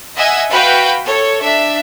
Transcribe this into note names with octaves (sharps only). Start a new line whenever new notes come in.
D#5 E5 F#5 G#5 E6
F#4 B4 F5 G5 B5
A4 C#5
D4 E5